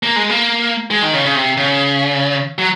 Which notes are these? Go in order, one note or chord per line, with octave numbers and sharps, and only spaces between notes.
A#3
G#3
A#3
G#3
D#3
C#3
C#3
C3
C#3
F#3